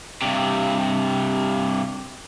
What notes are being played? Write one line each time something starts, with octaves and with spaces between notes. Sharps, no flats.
G2 C3